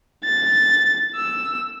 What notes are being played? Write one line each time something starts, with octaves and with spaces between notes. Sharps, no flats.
A6
E6